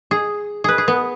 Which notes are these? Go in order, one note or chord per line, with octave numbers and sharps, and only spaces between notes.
G#4
G#4 B4
G#4
B3